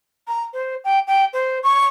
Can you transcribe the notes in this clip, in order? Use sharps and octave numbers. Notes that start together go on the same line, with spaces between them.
A#5
C5
G5
G5
C5
C#6